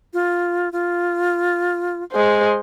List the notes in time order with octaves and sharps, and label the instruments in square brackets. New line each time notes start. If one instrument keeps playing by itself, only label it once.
[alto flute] F4
F4
[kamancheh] G#3 C5